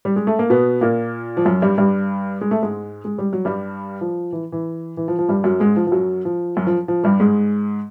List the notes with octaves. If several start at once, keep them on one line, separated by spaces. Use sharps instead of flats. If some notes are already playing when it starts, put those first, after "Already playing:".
G3
G#3
A3
A#3
B2 B3
A#2 A#3
F3
F#2 F#3
G2 G3
G2 G3
G#3
A3
G#2 G#3
G#3
G3
F#3
G2 G3
F3
E3
E3
E3
F3
F3
G2 G3
F#2 F#3
G#2 G#3
F3
F3
F#2 F#3
F3
F#2 F#3
F3
F3
G2 G3
G#2 G#3